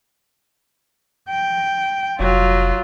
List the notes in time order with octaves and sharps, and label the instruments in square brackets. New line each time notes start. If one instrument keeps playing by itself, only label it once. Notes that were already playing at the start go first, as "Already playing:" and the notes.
[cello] G5
[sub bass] F1 [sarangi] F#3 [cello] F4